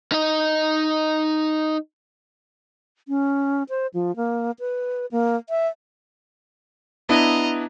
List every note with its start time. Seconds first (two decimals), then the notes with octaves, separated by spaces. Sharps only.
0.12 D#4 D#5
3.08 C#4
3.69 C5
3.94 F3
4.16 A#3
4.59 B4
5.11 A#3
5.49 E5
7.09 B3 D4 E4 D#5 A#5